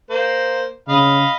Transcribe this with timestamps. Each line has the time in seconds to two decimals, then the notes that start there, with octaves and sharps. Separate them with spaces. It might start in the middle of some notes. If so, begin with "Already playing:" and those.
0.10 A#3 C5
0.88 C#3 D#5 F5 B5